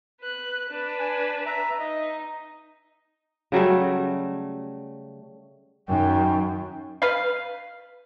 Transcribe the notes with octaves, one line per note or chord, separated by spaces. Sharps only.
B4 F#6
D4 B4
G#5
E5 A#5
D#4 D#5
C#3 F#3 G3 A3
F#2 D#3 G5
B4 F5